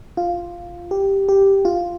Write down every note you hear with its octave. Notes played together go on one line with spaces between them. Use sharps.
F4
G4
G4
F4